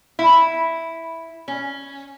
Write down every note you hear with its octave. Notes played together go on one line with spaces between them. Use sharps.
E4
C#4